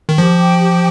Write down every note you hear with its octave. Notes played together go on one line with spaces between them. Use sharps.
D#3
F3 G4
G5
G4